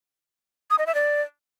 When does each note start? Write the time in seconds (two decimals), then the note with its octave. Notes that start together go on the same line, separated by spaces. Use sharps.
0.70 D#6
0.79 D#5
0.87 E5
0.95 D5